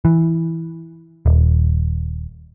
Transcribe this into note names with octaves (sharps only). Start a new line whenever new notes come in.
E3
D#1